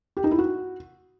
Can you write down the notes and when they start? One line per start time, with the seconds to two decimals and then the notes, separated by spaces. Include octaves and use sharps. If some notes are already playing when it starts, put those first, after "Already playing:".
0.17 G4
0.24 D#4
0.31 E4
0.39 F#4